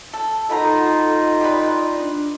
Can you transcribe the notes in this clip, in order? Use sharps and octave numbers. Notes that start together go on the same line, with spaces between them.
A4
B2 D#4 F4 A4 B4 F#5 A#5
G4 B4 D5 C6
D4